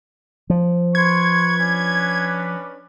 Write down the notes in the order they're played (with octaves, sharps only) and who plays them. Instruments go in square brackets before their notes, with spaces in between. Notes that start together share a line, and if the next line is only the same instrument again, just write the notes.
[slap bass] F3
[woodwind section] B4 C6 C#6 [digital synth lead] G#6
[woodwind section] C#4 D4 B4